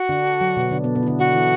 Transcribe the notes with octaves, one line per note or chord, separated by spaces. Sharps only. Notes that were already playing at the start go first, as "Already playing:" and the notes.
Already playing: F#4
D3 D4
F#3
B2 B3
D3 D4
B2 B3
B2 B3
E4
D3 D4
D3 D4 F#4
E3 E4